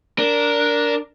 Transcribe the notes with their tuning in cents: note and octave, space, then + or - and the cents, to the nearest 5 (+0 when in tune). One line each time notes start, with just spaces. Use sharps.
D4 -10 A#4 +0